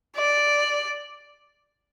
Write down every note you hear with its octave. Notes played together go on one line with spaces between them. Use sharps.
D5